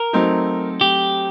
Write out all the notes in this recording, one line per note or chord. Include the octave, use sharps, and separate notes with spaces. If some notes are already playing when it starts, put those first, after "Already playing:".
Already playing: A#4
F#3 A3 C4 D#4
G4